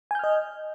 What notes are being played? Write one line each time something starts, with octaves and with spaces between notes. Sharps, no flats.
D#5 G#5 F6 G6